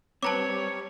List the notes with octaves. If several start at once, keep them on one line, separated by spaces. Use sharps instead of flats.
G3 C4 B4 C#5 A5 A#5 D6